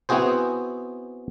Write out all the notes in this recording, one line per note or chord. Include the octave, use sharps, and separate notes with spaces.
B3 C4 E4 F#4 G#4 C5